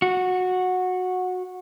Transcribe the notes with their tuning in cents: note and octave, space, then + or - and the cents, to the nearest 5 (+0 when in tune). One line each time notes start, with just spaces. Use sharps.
F#4 -15